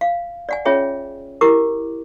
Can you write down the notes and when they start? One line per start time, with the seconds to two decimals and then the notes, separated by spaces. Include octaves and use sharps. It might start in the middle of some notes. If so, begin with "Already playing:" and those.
0.01 F5
0.49 D5 F#5 G#5
0.65 C#4 F4 G#4 C#5 E5 G5
1.41 E4 G4 A#4 D6